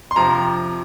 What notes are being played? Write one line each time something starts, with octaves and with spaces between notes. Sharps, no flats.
C6
F2 C3 F3 A#5